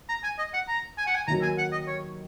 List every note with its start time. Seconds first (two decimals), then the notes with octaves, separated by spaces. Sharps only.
0.09 A#5
0.23 G#5
0.39 D#5
0.53 F#5
0.68 A#5
0.98 G#5
1.07 F#5
1.15 G#5
1.27 D#2 D#3 F#3 A#5
1.43 G#5
1.58 F#5
1.72 D#5
1.87 C#5